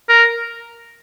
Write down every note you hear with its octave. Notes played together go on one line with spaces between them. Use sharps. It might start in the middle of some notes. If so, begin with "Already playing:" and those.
A#4